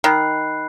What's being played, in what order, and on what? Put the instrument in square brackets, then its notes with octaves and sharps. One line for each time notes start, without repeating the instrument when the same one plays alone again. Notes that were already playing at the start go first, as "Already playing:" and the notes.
[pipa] D#3 [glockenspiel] B5 F#6 C7